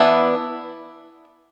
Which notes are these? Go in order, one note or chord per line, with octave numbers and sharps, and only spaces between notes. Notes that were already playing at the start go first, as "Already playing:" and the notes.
Already playing: E3 B3 D4 E4